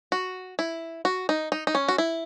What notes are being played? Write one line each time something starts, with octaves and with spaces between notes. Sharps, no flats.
F#4
E4
F#4
D#4
D#4
D#4
C#4
F#4
E4